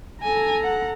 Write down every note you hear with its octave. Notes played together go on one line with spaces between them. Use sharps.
A4 G#5 A#5
F#5